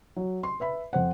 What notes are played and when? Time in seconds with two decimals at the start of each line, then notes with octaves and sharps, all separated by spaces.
0.16 F#3
0.43 C6
0.60 B4 E5 B5
0.93 F2 C5 F#5